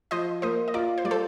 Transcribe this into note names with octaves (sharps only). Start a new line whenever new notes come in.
F3 C5 D#5
A#3 C5 D#5
D#5
F4 A#4 D5
C5
G3 D5
A4 C5